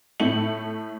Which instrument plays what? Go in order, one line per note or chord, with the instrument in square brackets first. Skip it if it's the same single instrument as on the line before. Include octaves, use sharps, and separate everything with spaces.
[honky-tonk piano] A2 A3 E4 C#7 F#7